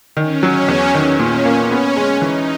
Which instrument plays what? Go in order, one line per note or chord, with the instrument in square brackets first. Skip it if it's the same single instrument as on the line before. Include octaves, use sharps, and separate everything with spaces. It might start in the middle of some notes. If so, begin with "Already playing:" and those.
[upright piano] D#3 [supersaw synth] C#4
[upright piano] F#3
E2
D#3
[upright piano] A#2 [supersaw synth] C#4
[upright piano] A#3
[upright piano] B3 [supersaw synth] C#4
[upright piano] G#3
[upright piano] E3 [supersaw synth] D#4